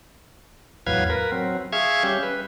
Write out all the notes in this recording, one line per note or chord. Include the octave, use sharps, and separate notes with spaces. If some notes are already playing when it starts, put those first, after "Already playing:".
E2 A2 F#3 B4 F5 G#6
A#4 B4
F#3 C4
G#4 E5 F5 C#6 G#6
G3 C#4 G4
B4